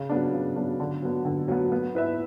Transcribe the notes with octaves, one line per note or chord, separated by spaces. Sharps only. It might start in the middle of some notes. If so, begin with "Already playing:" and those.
Already playing: C#3
F#3 B3 D4
C#3
F#3 B3 D4
D3
F#3 B3
D3
F#3 B3
B3
E4 B4 E5